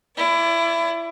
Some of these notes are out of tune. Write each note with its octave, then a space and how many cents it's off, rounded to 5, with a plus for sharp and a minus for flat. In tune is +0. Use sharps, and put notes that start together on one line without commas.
E4 +25 D5 -25